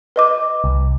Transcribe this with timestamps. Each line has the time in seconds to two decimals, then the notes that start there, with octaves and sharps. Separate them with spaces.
0.16 B4 D#5 D6
0.64 C2